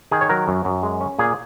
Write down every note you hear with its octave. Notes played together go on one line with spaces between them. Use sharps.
D#3 G#4
C#5
F#3 A#4
F#2
F#2
G#3
C#4
A#2 G#4